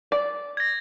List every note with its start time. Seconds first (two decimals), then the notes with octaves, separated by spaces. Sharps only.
0.12 D5
0.57 G#6 A#6